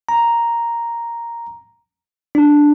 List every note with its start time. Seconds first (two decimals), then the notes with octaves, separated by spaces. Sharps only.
0.09 A#5
2.35 D4